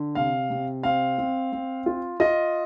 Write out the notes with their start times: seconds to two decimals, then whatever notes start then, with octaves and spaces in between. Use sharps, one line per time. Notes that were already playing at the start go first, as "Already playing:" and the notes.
Already playing: D3
0.15 C3 F5
0.50 C3
0.83 C4 F5
1.18 C4
1.52 C4
1.86 F4
2.20 F4 D#5